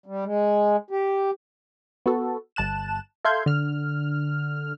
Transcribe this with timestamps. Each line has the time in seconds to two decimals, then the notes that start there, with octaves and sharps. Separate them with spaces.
0.06 G3
0.25 G#3
0.90 G4
2.06 B3 F#4 A4
2.56 G1 A5 F#6 E7
3.25 A4 E5 F5 C6 G6 G#6
3.46 D3 F6